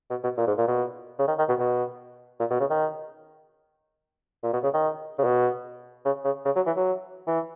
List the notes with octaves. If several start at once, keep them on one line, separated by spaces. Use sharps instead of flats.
B2
B2
A#2
G#2
A#2
B2
C#3
D#3
D#3
B2
B2
A#2
B2
C#3
D#3
A#2
B2
C#3
D#3
C#3
B2
C#3
C#3
C#3
F#3
E3
F#3
E3